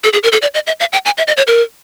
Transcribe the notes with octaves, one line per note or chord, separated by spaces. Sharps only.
A4
G#4
A#4
A4
D5
D#5
E5
F5
G5
G#5
E5
D#5
C#5
A#4